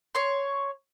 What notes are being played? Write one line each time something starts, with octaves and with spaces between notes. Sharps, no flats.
C#5 C6